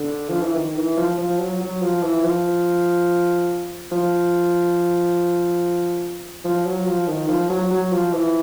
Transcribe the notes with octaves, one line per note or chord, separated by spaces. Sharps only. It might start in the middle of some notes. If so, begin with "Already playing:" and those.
Already playing: D3
F3
E3
D#3
E3
F3
F3
F#3
F#3
F3
E3
F3
F3
F3
F#3
F3
D#3
F3
F#3
F#3
F3
E3